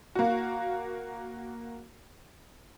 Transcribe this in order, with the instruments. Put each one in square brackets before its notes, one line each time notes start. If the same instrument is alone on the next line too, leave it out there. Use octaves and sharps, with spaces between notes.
[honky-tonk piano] A#3 F#4